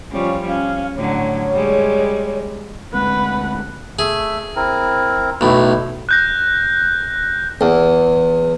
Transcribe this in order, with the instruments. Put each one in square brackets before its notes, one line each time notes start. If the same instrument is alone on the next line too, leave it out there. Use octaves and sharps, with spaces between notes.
[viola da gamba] F3 G3 F4 [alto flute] C#4
[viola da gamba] C#4 [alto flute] F5
[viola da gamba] A2 D3 F#3 [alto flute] C#5
[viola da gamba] G3 G#3
[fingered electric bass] D2 G#3 C4 [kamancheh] B4 [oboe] F#5
[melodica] A3 E5 [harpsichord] G#4
[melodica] C4 E4 A#4
[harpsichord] B1 A2 [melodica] E4
[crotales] F#6 G6 A#6
[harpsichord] E2